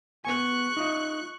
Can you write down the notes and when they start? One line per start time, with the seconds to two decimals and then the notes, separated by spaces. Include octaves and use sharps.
0.25 B3 G#5 C#6 F#6
0.77 D#4 F4 D#5